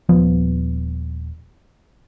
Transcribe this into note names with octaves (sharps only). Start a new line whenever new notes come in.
D#1 F3 B3